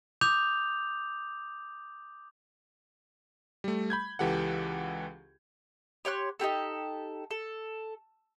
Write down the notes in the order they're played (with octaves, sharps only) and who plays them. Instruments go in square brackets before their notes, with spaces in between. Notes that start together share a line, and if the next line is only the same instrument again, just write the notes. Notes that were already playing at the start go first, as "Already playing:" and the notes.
[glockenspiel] D6 D#6 G6 F7
[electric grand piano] G3 A3
B5 G6 G#6
C#2 E3 G4 A4 F#5
[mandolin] G4 C#5 C6 F#6
D#4 E4 G4 A4
A4